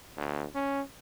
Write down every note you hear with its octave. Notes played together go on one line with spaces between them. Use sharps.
D2
C#4